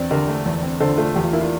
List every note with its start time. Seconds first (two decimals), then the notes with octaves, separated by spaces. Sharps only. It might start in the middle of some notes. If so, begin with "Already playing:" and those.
Already playing: E2 C4 D5
0.10 D3 G4 A#4
0.28 A3
0.46 E2
0.63 C4
0.80 D3 A4 C5
0.97 A3 F4 A4
1.15 E2 G4
1.23 F4
1.33 A#3 E4
1.41 D4 F4